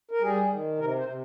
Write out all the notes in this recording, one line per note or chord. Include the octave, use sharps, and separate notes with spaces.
A#4
G3 G#4
D#3
C3 A#4
C5
C3